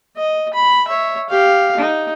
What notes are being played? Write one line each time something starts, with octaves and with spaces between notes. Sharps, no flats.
D#5
B5
C#5 E5
G4 F5
D#4